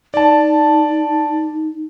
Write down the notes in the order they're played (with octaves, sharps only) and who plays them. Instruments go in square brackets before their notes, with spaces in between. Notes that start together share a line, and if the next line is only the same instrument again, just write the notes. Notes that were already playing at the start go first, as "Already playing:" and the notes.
[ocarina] D#4 [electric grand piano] D5 A5